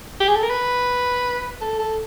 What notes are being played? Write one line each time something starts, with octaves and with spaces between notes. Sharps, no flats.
G4
G#4
A4
A#4
B4
A4
A4